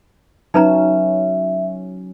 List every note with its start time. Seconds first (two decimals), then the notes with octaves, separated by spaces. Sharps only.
0.54 F#3 C#4 D#4 B4 E5 A#5